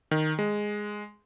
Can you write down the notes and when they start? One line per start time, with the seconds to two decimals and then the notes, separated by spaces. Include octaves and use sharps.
0.11 D#3
0.39 G#3